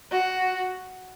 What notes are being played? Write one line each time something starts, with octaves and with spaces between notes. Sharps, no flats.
F#4